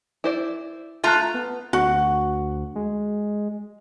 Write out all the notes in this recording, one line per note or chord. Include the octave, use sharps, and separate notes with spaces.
E4 C5 D5
A3 F4 E5 A5 A#5 F#6
B3
D2 F#4
G#3